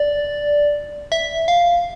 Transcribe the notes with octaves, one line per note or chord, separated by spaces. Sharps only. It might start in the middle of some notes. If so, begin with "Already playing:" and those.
Already playing: D5
E5
F5